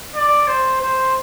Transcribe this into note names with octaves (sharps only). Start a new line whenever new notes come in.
D5
C5
C5